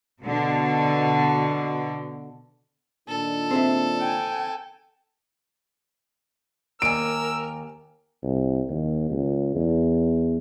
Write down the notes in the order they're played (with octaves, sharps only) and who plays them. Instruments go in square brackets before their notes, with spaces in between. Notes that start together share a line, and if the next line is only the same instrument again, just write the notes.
[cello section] B2 D3
[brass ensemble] A#2 D#3 D4 [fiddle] A4
[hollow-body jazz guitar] C4 G#4 E5
[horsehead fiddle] G5 G#5
[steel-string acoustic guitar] D#2 G#5 [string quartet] A#4 [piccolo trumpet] E6 [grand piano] D7
[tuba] C2
D#2
C#2
E2